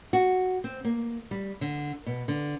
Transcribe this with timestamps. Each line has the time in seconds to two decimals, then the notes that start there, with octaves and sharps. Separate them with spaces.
0.13 F#4
0.64 C4
0.84 A#3
1.31 G3
1.61 D3
2.06 B2
2.28 D3